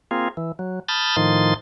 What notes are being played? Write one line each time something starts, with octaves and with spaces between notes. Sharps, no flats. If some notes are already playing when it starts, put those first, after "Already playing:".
A#3 C4 F4 G#4
E3
F#3
A5 B5 D#6 F6 G6 A6
A2 D#3 F3 D#4 C6 A6